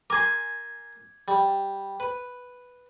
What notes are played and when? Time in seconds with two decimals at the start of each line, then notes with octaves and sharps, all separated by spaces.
0.10 A#4 G#5 C6 D6 G#6
1.28 G3
2.00 B4